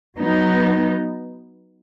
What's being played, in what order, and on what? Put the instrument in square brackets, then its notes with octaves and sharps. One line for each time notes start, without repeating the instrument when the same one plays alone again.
[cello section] F#3 B3 D#4